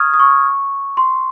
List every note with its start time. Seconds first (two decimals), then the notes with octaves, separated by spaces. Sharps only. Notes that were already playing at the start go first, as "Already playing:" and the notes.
Already playing: C#6 D#6 F6 G#6
0.14 D#6
0.19 C#6
0.97 C6